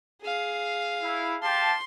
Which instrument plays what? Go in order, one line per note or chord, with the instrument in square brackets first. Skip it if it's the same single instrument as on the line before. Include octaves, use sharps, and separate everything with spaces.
[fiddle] G#4 F5
[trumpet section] E4
[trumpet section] G4 F5 A5 [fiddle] C6